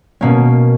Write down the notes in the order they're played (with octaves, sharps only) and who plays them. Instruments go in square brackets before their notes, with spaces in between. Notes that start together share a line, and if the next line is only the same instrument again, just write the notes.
[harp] B2 A#3 C#4